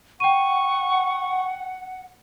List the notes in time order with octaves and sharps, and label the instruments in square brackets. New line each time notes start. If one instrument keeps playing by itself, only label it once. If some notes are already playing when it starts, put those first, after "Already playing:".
[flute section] F#5 [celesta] G5 D#7 [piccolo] C#6